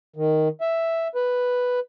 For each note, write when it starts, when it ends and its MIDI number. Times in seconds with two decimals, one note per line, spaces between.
0.16 0.48 51
0.61 1.08 76
1.15 1.80 71